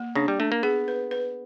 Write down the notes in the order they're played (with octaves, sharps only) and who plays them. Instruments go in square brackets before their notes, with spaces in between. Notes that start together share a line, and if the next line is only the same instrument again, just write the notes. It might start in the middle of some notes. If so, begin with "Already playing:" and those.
Already playing: [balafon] A#3
[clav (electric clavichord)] C#3 [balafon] D4
[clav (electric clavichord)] G3
[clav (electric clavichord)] A3 [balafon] D4
[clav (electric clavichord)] A#3
[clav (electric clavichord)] B3 [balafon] G#4
[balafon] B4
B4